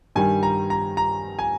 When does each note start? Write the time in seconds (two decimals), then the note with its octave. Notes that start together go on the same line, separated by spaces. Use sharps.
0.15 G2 D#3 G3 G#5
0.43 A#5
0.70 A#5
0.97 A#5
1.39 G#5